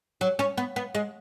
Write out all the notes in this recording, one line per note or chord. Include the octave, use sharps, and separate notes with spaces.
F#3
C#4
B3
B3
G#3